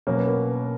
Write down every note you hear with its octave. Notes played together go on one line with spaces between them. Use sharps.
B2 F#3 A#3 C#4 C#5
B4
A#4
B4